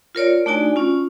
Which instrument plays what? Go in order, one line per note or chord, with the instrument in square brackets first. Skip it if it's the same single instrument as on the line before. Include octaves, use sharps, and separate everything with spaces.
[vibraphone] F4 A#4 C#5 D5
C#5
A3 D4 D#4 F#4 D5 G#5
C#4 F4